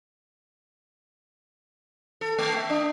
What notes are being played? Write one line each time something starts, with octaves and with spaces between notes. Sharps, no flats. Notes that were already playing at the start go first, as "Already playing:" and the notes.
A4
A3
E5
D4